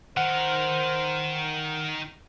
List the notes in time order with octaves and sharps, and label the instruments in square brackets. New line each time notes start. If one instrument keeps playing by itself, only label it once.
[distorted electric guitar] D#3 A#4 [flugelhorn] C5 [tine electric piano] F#5